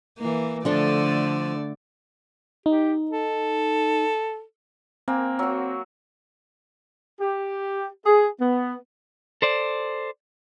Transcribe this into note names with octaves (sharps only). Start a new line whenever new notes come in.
E3 A#3
D3 F3 A3 D4 A4 D5
D#4 G4
A4
A#3 C4 G#5
F#3 F#4
G4
G#4
B3
A4 C5 D5